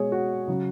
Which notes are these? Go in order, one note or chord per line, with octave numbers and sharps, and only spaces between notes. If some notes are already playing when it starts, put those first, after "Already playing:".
Already playing: B2 G#3 G#4 C#5
F#4
C#3 F#3